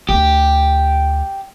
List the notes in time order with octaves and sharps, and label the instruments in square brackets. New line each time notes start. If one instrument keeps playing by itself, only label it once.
[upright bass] D2 D4 [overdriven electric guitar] G4